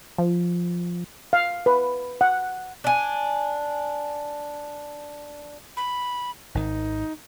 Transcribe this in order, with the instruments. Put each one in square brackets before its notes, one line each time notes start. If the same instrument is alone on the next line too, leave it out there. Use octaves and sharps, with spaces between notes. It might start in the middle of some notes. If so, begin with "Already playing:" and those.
[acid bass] F3
[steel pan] F5
B4
F#5
[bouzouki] D4 G#5
[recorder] B5
[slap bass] G#1 D#3 [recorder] D#4